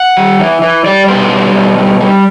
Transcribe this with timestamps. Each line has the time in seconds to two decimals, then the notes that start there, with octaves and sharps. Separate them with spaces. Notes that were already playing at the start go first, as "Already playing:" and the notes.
Already playing: F#5
0.17 G3
0.39 E3
0.62 E3
0.86 G3 D5
1.08 B2 C5
1.32 G3
1.54 B2
1.78 G3
2.00 G3